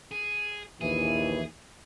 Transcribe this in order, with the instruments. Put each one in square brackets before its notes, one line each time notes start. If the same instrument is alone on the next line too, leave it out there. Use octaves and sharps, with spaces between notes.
[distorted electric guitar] G#4
[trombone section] A#1 D#2 E3 [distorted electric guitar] G#4